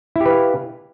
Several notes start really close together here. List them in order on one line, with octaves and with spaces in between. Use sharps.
E4 G4 B4 F5